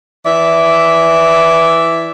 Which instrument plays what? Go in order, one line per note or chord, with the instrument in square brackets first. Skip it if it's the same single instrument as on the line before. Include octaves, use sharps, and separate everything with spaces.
[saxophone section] E3 D5 E5